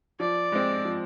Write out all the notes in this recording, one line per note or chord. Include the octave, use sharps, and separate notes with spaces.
F3 D5
G#3 C4
F3